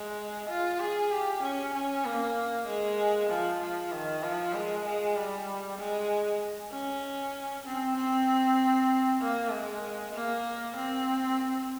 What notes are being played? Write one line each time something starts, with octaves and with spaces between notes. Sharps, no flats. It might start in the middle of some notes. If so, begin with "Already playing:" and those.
Already playing: G#3
F4
G#4
G4
C#4
C#4
A#3
G#3
F3
F3
D#3
F3
G#3
G#3
G3
G#3
C#4
C4
C4
A#3
G#3
A#3
C4